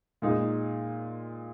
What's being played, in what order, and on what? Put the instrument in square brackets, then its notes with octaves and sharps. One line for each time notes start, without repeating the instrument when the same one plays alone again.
[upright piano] A#2 G#3 D#4